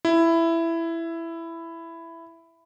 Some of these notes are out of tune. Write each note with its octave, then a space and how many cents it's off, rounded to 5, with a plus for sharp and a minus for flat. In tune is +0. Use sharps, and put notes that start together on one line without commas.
E4 +10